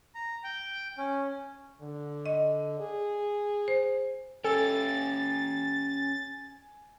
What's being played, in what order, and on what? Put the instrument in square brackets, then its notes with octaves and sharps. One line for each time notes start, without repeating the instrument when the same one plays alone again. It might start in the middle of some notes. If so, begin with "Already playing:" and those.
[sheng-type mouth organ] A#5
G5
C#4
[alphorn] D3
[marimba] D#5
[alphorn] G#4
[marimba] C5
[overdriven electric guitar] C#4 G4 [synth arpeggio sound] A4 [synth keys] G#5 [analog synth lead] A6